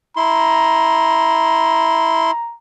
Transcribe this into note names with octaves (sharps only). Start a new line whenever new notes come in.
E4 A#5 C6